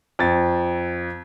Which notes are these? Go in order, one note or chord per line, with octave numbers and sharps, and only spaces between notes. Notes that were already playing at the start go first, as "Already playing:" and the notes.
F2 A6